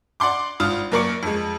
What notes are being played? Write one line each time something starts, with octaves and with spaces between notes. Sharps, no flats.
D5 F#5 C6 D6
G#1 F4 D#6 F6
F#2 A#3 A#4 D5 C#6 C#7
F2 G#3